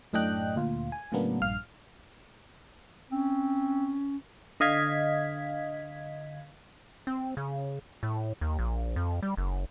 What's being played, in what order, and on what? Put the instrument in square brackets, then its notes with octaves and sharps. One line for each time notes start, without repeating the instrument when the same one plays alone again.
[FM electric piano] F#2 A2 D4 D#5 G5 F#6
D2 A#2 F4
G#5
A2 C#3 F#3 A#3 B3 D4
A#1 G2 F5 F6
[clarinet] C4 [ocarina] C#4
[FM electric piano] D3 D#5 F5 G#6 B6
[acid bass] C4
C#3
A2
D#2
A#1
F2
G3
F#1